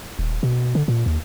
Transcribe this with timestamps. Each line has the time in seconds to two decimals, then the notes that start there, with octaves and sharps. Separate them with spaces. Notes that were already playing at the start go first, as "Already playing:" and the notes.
0.19 D#1
0.43 B2
0.75 D3
0.88 A#2
1.06 D#2